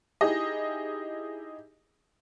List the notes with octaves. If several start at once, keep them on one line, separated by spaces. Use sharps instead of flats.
D#4 E4 G4 G#4 D#5